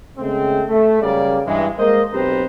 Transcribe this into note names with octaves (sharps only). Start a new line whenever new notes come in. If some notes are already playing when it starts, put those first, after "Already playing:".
C#3 G#3 A3 C4
A3
F#1 C#3 G3 A#3 D5
G2 E3 G#3
G#3 A#3 A#4 C5 D#5
B1 C4 G4 B4 C5 A#5